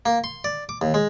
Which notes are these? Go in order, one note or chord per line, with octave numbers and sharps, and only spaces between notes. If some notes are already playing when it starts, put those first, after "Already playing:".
A#3
C6
D5
D6
D#2
G#3